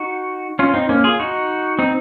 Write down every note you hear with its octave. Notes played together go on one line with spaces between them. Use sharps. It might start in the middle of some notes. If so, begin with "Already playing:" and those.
Already playing: D#4 F#4
C#4 F4
C4 D#4
A#3 C#4
F4 G#4
D#4 F#4
C4 D#4